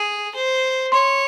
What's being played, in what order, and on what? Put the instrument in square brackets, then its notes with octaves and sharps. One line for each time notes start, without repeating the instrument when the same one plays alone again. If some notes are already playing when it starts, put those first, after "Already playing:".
Already playing: [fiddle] G#4
C5
[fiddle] C#5 [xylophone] C6